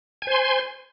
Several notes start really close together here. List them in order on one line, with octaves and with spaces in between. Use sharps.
G#5 C5 C6